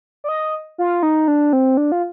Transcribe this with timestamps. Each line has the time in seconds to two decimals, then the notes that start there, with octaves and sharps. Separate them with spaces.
0.24 D5
0.29 D#5
0.78 F4
1.03 D#4
1.28 D4
1.53 C4
1.77 D4
1.92 F4